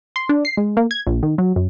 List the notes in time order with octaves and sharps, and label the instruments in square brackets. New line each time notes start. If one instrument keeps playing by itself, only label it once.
[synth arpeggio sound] C6
D4
C7
G#3
A#3
G#6
A#1
D#3
F#3
F#2